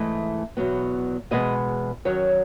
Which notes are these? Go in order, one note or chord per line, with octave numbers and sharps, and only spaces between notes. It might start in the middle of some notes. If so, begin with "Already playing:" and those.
Already playing: G#2 E3 A3 D#5
E2 B2 F#3 B3
E2 B2 G#3 B3 D#5
F#2 D#3 F#3 C#5